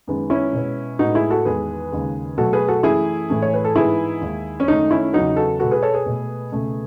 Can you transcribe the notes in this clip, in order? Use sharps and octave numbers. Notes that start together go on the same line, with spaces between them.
F#2 D#3 G#3 B3
C#4 E4
B2 G#3 B3
A2 G#3 B3 D#4 F#4
E4 G#4
F#4 A4
E2 D#3 G#3 B3 G#4 B4
D#2 C#3 G#3
B2 F#3 A3 F#4 A4
G#4 B4
F#4 A4
F#2 E3 A3 E4 G#4
A2 E3 A3
C#5
B4
A4
G#2 E3 B3 E4 G#4
D#2 D#3 G#3
C#4
F#2 D#3 A3 D#4
C#4 E4
E2 C#3 F#3 B3 D#4 F#4
F#4 A4
B2 G#3 B3 F#4 A4
G#4 B4
A4 C#5
G#4 B4
B2 A3
C#2 B2 A3